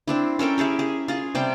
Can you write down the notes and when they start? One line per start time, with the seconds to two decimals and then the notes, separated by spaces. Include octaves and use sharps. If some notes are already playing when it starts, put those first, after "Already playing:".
0.07 C4 D4 E4
0.39 C#4 A4 A#4 G5
0.58 E4 G4 G#4 C#5
0.79 G#4
1.08 F4 G#4
1.35 C3 G3 G5